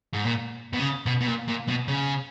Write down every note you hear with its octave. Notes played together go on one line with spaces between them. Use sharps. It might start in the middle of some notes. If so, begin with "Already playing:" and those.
G#2
A#2
B2
C#3
B2
B2
A#2
A#2
B2
C#3